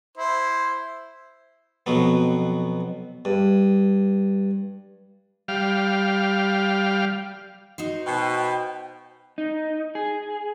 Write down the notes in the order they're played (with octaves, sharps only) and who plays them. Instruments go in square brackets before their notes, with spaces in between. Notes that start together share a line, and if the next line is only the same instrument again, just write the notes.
[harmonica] E4 C5
[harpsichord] F2 B2 F#3 B3
G2
[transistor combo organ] G3 F5
[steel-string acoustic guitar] D#4 F#4 C5
[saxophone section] B2 [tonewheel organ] G5
[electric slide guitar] D#4
G#4